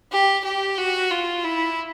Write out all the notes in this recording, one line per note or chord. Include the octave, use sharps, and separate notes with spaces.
G4
G4
F#4
F4
E4